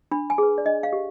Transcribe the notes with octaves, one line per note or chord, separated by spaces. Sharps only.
D4 B5
G#5
G#4 B4
D5
D4 D#5
F5
G4